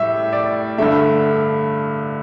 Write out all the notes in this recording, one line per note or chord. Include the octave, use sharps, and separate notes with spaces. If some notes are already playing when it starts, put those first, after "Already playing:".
Already playing: A2 G3 E5
D5
G2 D3 A3 E5